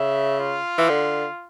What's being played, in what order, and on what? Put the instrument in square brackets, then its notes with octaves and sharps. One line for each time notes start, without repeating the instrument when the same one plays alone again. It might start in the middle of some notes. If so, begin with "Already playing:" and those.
Already playing: [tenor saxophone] C#3 [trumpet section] E5
[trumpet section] F4
[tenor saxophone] E3
D3